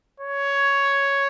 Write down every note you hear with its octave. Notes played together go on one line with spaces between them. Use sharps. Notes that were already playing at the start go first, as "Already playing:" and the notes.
C#5